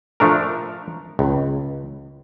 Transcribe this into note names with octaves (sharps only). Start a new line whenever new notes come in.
F3 A3 D4 A#4
C#2